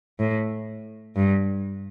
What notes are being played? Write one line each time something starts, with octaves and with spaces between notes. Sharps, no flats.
A2
G2